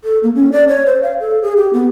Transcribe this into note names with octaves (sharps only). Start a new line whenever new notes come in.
A4
A#3
C#4
D5
C#5
C5
F5
A4
G#4
G4
B3